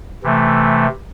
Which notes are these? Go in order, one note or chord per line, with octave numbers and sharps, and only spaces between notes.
C3 E3 A3